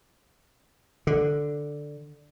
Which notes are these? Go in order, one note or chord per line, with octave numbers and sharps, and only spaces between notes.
D3